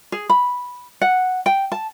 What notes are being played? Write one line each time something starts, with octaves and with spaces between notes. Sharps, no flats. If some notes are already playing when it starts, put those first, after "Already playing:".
G#4
B5
F#5
G5
A5